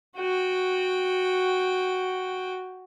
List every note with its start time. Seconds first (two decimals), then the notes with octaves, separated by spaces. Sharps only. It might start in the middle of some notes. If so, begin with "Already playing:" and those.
0.17 F#4 G5